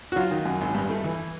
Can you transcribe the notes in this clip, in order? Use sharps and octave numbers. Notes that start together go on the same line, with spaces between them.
F#4
F#3 F4
D#3
F#2
G#1
G2
A3
E3